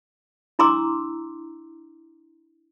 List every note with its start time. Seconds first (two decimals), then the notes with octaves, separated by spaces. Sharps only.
0.59 D4 E4 A#5 C6 D6 E6